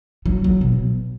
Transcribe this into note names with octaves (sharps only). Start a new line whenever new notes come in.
F#3
F#3
B2